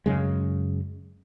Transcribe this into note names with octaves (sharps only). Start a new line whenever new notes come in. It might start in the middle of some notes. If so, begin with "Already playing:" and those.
F#2 C#3 G#3